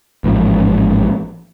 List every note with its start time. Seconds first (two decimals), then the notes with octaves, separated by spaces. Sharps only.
0.24 A1 G#2 F3